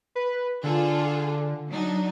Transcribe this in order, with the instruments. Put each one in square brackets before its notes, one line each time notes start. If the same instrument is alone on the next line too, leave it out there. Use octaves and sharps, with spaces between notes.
[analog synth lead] B4
[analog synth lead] D3 [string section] F4 G#4 A4
[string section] F#3 D4 D#4